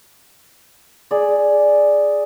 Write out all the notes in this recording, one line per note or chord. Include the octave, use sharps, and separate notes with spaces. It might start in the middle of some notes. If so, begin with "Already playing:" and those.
G#4 D5